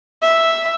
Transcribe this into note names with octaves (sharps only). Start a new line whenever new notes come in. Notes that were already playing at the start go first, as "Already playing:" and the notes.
E5